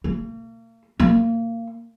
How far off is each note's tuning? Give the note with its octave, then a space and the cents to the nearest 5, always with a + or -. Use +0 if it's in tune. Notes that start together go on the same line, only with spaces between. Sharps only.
A#3 -40
A#3 -25